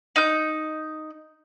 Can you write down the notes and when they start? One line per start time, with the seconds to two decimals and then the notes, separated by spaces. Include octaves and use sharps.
0.16 D#4 G6